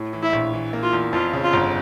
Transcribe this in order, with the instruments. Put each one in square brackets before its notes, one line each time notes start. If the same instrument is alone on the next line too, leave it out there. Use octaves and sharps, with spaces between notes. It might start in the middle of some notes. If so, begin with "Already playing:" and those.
Already playing: [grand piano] A2
E3
[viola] E4
[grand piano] A#1
E3
A#3
[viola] F4
[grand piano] E2
[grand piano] F2 [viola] F4
[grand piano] C#3
[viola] F4
[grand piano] G1